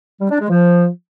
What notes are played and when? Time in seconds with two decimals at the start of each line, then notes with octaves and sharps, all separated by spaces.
0.21 G3
0.30 D4
0.40 G#3
0.50 F3